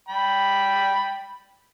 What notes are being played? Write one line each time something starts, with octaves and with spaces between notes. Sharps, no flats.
G5 B5